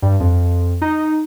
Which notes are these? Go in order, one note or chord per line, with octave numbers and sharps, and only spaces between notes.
G2
F2
D#4